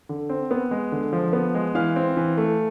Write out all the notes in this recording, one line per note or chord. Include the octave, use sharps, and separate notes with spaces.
D3
C4
B3
G#3
D3
F3
B3
G#3
E3 F5 F6
C4
E3
A3